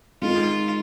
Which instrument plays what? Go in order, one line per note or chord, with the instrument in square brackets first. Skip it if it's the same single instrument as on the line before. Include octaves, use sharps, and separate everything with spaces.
[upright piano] D#3 G#3 D#4 [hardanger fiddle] F4